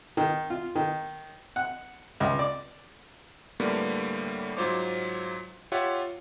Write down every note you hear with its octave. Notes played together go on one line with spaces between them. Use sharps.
D#3
F4
D#3
F#5
C#2
D5
A2 D3 G3 A#3 B3
G#2 F#3 F4 C5 C#5 D6
F4 G4 C#5 E5 F#5